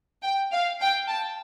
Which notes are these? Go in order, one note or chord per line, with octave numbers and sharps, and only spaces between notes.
G5
F5
G5
A5